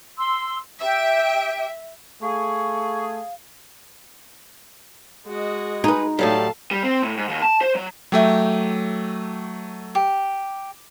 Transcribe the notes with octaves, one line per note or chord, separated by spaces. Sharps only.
C6 E6
G4 E5 G5
A3 G#4 F5 C#6
G#3 F#4 D#5
D#4 G#4 B4
A2 F#3 G3 A4 F5 A5
G3
C4
A2
G#2
D#2
A5
C5
F#3
F#3 A3 G4 E5
G4